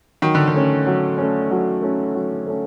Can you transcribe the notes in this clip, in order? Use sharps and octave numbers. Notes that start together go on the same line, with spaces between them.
D#3 F#3
D3
D#3
A3 C#4
F#3
A3 C#4
F#3
A3 C#4
F#3
A3 C#4